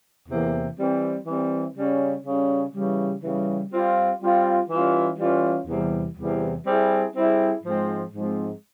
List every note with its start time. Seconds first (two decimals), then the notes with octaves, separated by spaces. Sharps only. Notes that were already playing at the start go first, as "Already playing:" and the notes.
0.28 E2 C3 E3 A#3
0.78 E3 G3 C4
1.27 E3 G3 C4
1.75 C#3 G3 C#4
2.25 C#3 G3 C#4
2.74 C#3 E3 G3
3.23 C#3 E3 G3
3.72 G3 C4 F4
4.21 G3 C4 F4
4.70 E3 G3 C#4 F4
5.19 E3 G3 C#4 F4
5.68 E2 C3 E3 G3
6.17 E2 C3 E3 G3
6.66 G3 C4 E4 G#4
7.14 G3 C4 E4 G#4
7.64 G#2 F3 G#3 C4
8.13 G#2 F3 G#3 C4